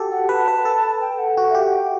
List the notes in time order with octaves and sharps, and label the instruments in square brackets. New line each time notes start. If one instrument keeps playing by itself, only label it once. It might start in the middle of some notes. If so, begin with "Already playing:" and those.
Already playing: [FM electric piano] F#4 G4 A4
[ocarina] F#5
[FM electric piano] B4 [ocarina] A5
[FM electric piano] B4
A4
[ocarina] G5
F#5
[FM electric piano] F#4
[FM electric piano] G4 [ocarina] E5
[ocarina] F#5
G5